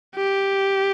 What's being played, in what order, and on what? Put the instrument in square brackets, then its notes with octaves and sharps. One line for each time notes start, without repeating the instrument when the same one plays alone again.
[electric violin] G4